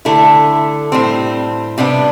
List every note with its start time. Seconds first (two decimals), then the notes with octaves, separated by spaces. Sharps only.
0.05 D3 A3 E4 A4
0.92 A2 G3 C4
1.78 C3 G3 B3 D4